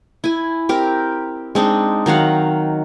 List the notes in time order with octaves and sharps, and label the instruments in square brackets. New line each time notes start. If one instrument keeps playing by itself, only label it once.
[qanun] E4 G#5
C4 G4 A#4
G#3 C4 D4 D#4
D#3 F#3 F5 F#5